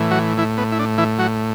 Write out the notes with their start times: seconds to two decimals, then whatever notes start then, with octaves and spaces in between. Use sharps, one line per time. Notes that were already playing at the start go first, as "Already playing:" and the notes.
Already playing: A2 E3
0.11 F#3 F#4
0.37 E3 E4
0.58 B3
0.72 E4
0.79 D4
0.98 E3 E4
1.18 F#3 F#4